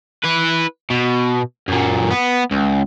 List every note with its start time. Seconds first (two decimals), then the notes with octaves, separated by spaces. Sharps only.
0.24 E4 B4
0.90 B2
1.68 F#2 A#2
2.11 B3
2.51 C#2